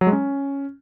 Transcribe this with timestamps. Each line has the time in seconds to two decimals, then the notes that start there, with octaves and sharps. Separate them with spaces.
0.01 F#3
0.07 G#3
0.12 C#4